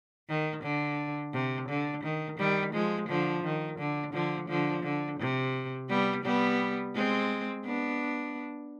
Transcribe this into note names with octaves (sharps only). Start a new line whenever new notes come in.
D#3
D3
C3
D3
D#3
D#3 G3
F3 G#3
D3 F3
D#3
D3
D3 F3
D3 F3
D3
C3
G3 B3
G3 B3
G#3 C4
B3 D4